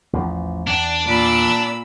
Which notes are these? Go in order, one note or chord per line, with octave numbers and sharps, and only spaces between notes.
A1 E2 F3
E2 D4
A#2 B5 E6